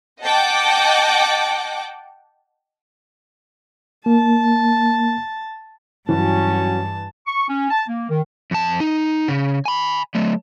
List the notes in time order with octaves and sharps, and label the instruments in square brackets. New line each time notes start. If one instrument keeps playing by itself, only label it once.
[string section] D#5 F#5 G5 A5 D6
[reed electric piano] A#3 [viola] A5
[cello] G2 [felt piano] E3 [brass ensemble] F#3 C#4 F#4 [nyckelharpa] A5
[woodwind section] C#6
C#4
A5
A#3
D#3
[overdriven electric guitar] F2 A5
D#4
C#3
G#5 B5
F#3 A3